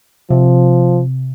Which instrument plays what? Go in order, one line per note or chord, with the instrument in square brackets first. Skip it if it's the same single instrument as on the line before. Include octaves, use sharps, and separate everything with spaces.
[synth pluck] C3 [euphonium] F3